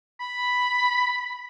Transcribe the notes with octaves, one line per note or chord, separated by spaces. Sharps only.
B5